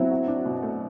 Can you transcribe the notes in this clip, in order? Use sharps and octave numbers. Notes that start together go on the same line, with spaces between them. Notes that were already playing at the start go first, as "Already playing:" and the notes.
Already playing: F#3 C4 E4
F#4
D4
B2
A3